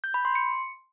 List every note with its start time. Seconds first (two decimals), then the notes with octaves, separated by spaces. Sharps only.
0.04 G6
0.14 B5
0.25 C6
0.35 C#7